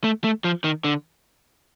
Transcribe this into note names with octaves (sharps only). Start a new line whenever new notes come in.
A3
A3
F3
D#3
D3